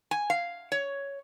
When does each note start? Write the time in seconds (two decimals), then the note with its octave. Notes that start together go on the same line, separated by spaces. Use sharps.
0.11 G#5
0.30 F5
0.72 C#5